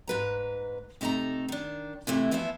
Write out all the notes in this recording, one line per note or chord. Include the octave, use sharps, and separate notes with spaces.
G#2 B4 A#5
C3 A3 D#4 A4 A#5
D#3 D4
C3 E3 A3 E4
E3 F3 B3 E4 D#5 E5